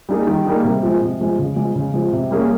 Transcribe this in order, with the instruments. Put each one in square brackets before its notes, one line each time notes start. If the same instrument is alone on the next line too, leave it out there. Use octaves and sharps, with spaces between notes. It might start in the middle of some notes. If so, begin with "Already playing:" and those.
[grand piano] G3 A#3 D#4 G#4
D#3
G3 A#3 D#4 G#4
C3
F3 G#3
C3
F3 G#3
C#3
F3 G#3
C#3
F3 G#3
C3
G3 A#3 C#4 G#4